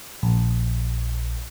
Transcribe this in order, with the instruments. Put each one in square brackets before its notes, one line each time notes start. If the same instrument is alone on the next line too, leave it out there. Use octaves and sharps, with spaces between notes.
[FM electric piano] A#1